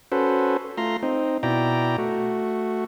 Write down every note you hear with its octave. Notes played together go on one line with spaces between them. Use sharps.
C#4 F#4 A4 B4 C5
A3 F4 A#5 C6
C4 D#4
B2 E4 D5 G5 A#5
A3 F#4